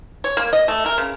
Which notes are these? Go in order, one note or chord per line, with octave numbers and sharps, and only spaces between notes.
C#5
A#3
D#5
A3
A#4
C#3